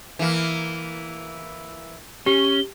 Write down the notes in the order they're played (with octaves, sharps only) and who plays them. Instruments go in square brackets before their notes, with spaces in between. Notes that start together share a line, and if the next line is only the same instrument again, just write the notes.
[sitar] E3 A#3
[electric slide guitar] C#4 [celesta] G4 [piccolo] G7